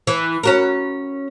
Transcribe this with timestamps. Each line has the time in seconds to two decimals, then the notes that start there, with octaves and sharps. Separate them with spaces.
0.07 E3
0.43 C#4 F#4 A#4